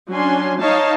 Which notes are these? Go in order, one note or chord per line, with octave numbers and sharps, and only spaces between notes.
F#3 C#4 D4 G#5 C6
D#4 C#5 D#5 F5 A5